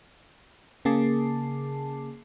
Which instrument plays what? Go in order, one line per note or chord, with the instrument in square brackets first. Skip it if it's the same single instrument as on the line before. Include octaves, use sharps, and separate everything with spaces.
[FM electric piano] C#3 A#3 G#4 A5 D6 C7